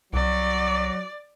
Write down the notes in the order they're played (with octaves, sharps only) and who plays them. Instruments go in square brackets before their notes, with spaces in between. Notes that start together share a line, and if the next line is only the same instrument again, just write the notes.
[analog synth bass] C2 [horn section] F#3 [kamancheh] D5